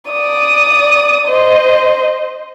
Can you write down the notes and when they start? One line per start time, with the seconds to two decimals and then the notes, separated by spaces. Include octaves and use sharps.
0.11 D5 D#6
1.28 C5 D#5